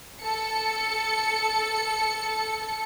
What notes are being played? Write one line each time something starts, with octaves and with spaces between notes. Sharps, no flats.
A4 C#7